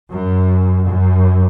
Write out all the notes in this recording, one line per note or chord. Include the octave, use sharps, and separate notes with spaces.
F#2
F#2